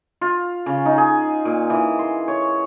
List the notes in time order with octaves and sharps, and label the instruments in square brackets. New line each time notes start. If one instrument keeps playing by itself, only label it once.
[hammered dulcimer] F4
C#3
D#4
G#4
A#2
E3
C6
C#5